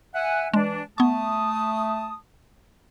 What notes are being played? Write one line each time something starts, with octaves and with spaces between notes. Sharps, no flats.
E5 F#5 G#5
E3 G#3 D4
A3 B3 A5 C#6 D#6